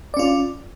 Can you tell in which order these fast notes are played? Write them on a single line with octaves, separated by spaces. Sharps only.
D5 C#4 F4